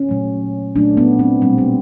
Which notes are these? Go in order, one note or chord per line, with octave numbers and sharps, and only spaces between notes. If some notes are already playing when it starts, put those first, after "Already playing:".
Already playing: C#4
A#2 F#3 A3
A#2 F#3 A3 D4
B3
C4
B2 G3 A#3 C4
B3